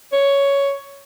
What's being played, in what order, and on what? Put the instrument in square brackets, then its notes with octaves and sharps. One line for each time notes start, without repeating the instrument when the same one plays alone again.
[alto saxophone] C#5